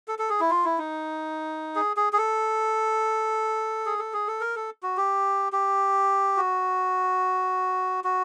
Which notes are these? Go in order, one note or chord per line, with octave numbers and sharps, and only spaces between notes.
A4
A4
G#4
E4
F4
E4
D#4
G#4
G#4
G#4
A4
G#4
A4
G#4
A4
A#4
A4
F#4
G4
G4
F#4
F#4